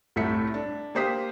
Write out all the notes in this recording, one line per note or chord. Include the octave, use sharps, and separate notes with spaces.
C2 A2 A3 E5 B6 C#7
D4
A#3 G4 C5 D#6 B6 C7